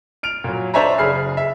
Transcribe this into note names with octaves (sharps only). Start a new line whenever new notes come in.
F6 D7 F7
A#2 F#3
D4 C5 C#5 E5 G#5 A#5
F#1 G#4 B5 F6 C7
E5